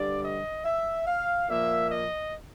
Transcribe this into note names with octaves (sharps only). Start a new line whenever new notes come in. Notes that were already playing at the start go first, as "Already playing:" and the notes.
Already playing: G2 D3 G3 D5
D#5
E5
F5
A#2 F3 A#3 E5
D#5